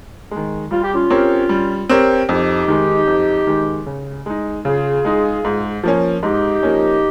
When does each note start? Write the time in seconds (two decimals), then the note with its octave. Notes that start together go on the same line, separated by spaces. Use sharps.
0.31 D#3 G#3
0.71 G3 F4
0.82 G4
0.93 C#4 F4
1.10 C4 G4 A#4 C#5
1.49 G3
1.89 C4 G4 A#4 C#5
2.28 F2 D#4 G4
2.68 D#3 G#3
3.07 F2
3.47 D#3 G#3
3.86 C#3
4.26 G#3 D#4
4.65 C#3 F4 G#4
5.05 G#3 D#4
5.45 G#2
5.84 F3 A#3 C#4
6.23 G#2 D#4 G4
6.63 F3 A#3 C#4